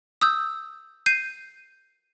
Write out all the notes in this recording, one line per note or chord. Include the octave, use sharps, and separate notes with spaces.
D#6 E6 G6
G6 C7 D#7